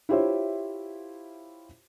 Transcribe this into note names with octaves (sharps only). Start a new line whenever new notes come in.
E4 F4 G4 C5 C#5 E5